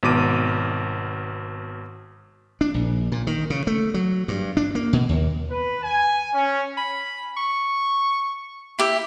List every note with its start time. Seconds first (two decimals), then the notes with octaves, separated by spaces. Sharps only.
0.03 G#1 B2 D6 D#7
2.61 D4
2.74 A#1
3.12 A#2
3.27 D#3
3.50 C#3
3.67 A3
3.94 F#3
4.28 G2
4.57 D4
4.75 A#3
4.93 B2
5.09 D#2
5.50 B4
5.83 G#5
6.34 C#4
6.77 B5
7.37 C#6
8.79 E4 G4 E5